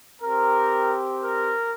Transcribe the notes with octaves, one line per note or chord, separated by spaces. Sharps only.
C4 G4 A#4
A#4